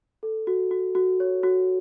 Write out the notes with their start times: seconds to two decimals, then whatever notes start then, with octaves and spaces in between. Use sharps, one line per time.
0.23 A4
0.47 F#4
0.71 F#4
0.95 F#4
1.20 C#5
1.43 F#4